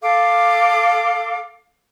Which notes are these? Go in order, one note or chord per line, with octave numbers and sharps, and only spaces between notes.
A4 F5 D6